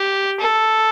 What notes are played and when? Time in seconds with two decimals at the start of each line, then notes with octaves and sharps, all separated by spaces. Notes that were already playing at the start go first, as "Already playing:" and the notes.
Already playing: G4
0.40 A4